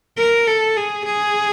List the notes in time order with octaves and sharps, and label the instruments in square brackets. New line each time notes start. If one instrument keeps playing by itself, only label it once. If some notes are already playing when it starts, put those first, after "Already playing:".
[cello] A#4
A4
G#4
G#4